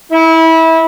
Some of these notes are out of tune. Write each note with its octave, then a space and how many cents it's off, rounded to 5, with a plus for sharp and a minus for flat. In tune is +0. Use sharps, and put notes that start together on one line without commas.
E4 -25